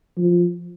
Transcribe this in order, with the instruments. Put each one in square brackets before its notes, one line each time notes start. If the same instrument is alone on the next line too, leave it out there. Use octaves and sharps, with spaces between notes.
[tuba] F3